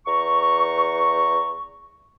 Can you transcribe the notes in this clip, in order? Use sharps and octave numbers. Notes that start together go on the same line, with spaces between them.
E2 A#5 C#6